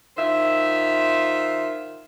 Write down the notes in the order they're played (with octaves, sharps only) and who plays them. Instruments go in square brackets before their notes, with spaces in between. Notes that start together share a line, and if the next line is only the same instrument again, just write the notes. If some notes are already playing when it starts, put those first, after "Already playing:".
[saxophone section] D#3 F4 C5 E5